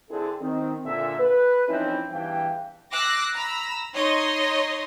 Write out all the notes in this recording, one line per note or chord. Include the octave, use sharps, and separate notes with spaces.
D3 C4 D4 E4 G#4 A4
D#3 C4
A#2 D3 E5
B4
E3 F3 C4 C#4 D#4 E4
E2 G2 E3 F5 G5
D6 E6 F#6 A#6 C7
A#5 B5 E6
D#4 C#5 D#5 C6